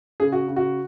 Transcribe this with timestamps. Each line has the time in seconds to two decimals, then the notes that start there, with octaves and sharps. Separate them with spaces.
0.20 C#3 G#4
0.32 F#4
0.48 C#3
0.56 F#4